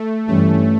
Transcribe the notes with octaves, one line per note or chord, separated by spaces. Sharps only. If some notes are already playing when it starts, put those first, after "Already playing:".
Already playing: A3
G2 E3 G3 A3 C#4